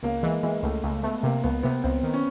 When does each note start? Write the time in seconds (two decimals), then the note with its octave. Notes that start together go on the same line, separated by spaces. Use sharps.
0.03 C#2 A#3
0.23 E3 G#3
0.43 E3 G#3
0.63 C#2 A3
0.83 C#2 A3
1.03 A3 B3
1.23 C3 A#3
1.44 C#2 B3
1.63 C3 B3
1.84 C#2 C4
2.03 D#3
2.14 C#4